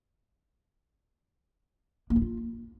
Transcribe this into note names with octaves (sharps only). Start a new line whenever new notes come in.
A#3
E4
F4